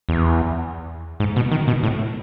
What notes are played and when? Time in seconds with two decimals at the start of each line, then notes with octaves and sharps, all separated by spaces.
0.09 E2
1.20 G#2
1.36 B2
1.51 D#3
1.68 B2
1.83 A2